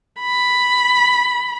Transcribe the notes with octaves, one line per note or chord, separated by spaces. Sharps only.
B5